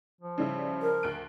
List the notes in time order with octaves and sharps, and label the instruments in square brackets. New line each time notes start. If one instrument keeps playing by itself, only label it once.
[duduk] F3
[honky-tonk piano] C#3 G3 E4
[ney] A#4
[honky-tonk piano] D2 F#6 D7